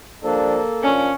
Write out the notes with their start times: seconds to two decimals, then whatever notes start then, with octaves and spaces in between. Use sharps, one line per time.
0.24 F3 G3 A#3 D4 A4
0.83 A#2 F3 C#4 D4